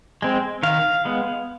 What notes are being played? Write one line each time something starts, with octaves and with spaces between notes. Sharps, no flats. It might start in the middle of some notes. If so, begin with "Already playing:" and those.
G#3 C4
D#3 F5
G#3 B3